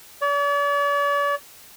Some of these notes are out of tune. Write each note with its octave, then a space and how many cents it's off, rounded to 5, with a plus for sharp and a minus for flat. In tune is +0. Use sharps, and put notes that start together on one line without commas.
D5 -45